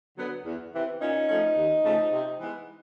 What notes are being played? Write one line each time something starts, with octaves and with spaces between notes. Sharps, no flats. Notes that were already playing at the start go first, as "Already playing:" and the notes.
D3 F#3 B3
E2
C3 E3
A#2 C#4 D#4
F3 A3 C#4
D#2
C#3 F3 A3
C3
E3 G#3 B3